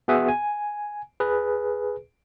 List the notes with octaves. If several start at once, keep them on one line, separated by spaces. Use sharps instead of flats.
B3 F#4 G#4 E5 F#5 G#5
G#5
G#4 B4